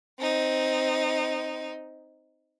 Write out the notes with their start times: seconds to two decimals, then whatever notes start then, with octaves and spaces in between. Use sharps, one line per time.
0.19 C4 D#4